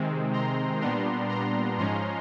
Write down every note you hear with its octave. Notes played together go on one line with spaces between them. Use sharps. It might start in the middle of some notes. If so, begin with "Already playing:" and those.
Already playing: C3 D#3 G#3 C4
A#5 C6
A#2 G3 B3 D4 A#5 C6
A#5 C6
G#2 F3 G#3 C#4 A#5 C6